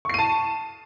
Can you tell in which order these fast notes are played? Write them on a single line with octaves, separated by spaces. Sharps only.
C#6 C7 D#7 A5